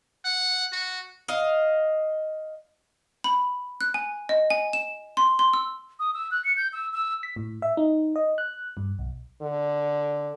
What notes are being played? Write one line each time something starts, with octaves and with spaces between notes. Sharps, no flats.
F#5
F#4
D#5 F5
B5
F#6
G#5
D#5
G#5
E7
C6
C6
E6
D#6
E6
F#6
C#7
G6
E6
E6
B6
A2
E5
D#4
D#5
F#6
G2
B1
D3